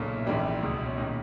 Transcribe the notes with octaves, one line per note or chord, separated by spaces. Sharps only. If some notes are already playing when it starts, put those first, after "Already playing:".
Already playing: B1 A#2 C#3 C#4
E4
A#1 G#2 E3 G3 G4
C#2 B2
C#4
A#2 D#3 D#4